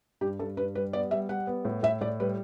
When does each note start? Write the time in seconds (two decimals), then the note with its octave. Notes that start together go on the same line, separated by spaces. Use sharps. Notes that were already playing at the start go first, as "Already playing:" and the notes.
0.21 G2 G4
0.39 G2 A4
0.57 G2 B4
0.75 G3 B4
0.93 B3 D5
1.11 G3 E5
1.29 G3 F#5
1.47 B3
1.65 A2
1.83 A2 E5
2.01 A2 D5
2.20 G3 B4